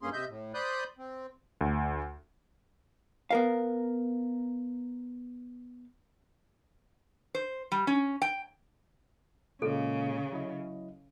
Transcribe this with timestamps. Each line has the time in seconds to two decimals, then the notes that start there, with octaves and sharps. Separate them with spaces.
0.02 G2 A#3 C#4 G#4 C6
0.13 C3 D#5 E5 G6
0.29 A2
0.54 C5 D5 B5 D#6 F#6 G6
0.98 C4
1.61 D2
3.31 B3 A#4 F5
7.35 C5
7.72 G3
7.87 C#4
8.22 G5
9.62 A#2 C#3 G#3 A#3 A4
10.32 F#3 E4 D#5